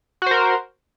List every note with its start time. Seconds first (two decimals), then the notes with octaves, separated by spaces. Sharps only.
0.22 F#4
0.26 C5
0.31 A#4